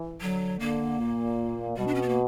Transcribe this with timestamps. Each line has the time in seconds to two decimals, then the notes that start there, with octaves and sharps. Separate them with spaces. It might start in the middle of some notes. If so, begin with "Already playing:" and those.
Already playing: E3
0.21 D3 F#3
0.60 D3 A#3
1.00 A#2
1.77 B2 G3
1.87 D4
1.95 C#4
2.02 B3
2.09 A#3